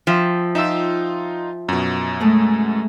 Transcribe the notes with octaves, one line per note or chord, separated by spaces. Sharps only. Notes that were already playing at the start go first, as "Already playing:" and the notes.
F3 E5 G5
D#4 F4 E5 G5 E6
F#2 B2
G#3 A3